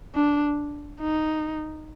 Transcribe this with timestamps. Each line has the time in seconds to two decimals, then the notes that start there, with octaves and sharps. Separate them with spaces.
0.15 D4
1.00 D#4